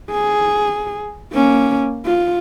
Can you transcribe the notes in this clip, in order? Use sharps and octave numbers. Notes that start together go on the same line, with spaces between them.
G#4
A#3 C#4
F4